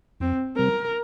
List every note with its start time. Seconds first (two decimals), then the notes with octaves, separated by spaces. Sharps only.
0.20 F2 C4
0.56 C3 G3 C4 A#4